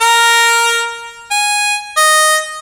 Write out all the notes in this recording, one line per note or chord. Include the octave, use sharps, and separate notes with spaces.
A#4 A#5
G#5
D#5